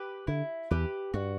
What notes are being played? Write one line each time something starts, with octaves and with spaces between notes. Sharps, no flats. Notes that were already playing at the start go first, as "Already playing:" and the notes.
Already playing: G4 B4
D3 E4
E2 G4 B4
G2 F#4